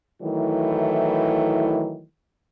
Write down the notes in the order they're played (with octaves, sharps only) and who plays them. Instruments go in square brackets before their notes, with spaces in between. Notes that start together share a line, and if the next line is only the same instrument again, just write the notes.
[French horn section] D#3 E3 F#3 A3 E4